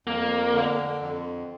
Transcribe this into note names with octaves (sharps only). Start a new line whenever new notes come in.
F2 A#3
D3
F2